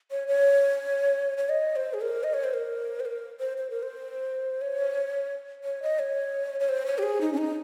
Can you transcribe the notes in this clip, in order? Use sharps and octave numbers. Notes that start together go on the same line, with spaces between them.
C#5
C#5
C#5
D#5
C5
G#4
A#4
D#5
C#5
C5
A#4
C5
A#4
C5
C5
A#4
C5
C#5
C#5
D#5
C#5
C#5
C5
C#5
G4
G#4
D#4
C#4
D#4